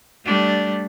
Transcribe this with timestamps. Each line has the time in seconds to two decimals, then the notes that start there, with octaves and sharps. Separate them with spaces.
0.25 G3 A3 D4